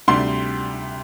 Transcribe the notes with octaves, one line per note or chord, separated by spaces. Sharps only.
D2 C3 G3 D4 C6